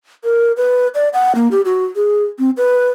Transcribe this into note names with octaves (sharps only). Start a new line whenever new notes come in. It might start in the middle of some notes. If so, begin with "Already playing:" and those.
A#4
B4
D5
F#5
A#3
G4
F#4
G#4
C4
B4